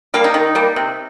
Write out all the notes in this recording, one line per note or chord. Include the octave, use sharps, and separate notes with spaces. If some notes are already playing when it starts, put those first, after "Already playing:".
G3 A#3 F5
D#4
D#3
G3 A#3
C3